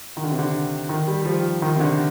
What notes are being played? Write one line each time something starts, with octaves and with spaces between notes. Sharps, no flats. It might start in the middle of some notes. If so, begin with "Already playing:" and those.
D#3
D3
C3
D3
D#3
G3
G3
F3
D#3
C3
D3